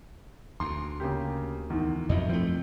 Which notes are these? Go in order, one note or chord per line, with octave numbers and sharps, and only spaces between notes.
D2 C6
C#3 A#3 G4
E2 G#2 D#3
F2 F3 F#3 E4 D#5
F3 A3 C4